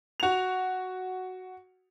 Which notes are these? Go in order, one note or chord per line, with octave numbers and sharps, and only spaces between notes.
F#4 F7